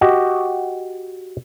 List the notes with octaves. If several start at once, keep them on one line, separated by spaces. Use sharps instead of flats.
F#4 G4 D#5